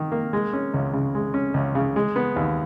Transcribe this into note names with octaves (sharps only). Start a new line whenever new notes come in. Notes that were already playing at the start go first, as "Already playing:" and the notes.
Already playing: D#3
A#3
G#3
C#4
C#2
C#3
G#3
C#4
C#2
C#3
G#3
B3
D#2